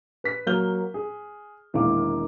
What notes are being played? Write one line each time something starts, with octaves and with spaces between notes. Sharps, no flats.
B4 B6
F#3 A#3 F6 G6 G7
G#4
E1 D#3 A#3 E4 F5 D6